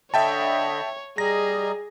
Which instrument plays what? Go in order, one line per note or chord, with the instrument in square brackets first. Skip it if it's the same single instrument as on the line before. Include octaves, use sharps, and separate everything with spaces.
[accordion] D3 D#5 B5 [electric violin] C#5 [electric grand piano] E5 G5 A5
[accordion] G3 D#5 A#5 [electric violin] G#4 [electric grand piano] A#6